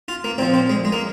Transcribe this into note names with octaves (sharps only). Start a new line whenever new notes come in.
F4
A#3
A#2 F3 C4
C4
G#3
G#3
A#3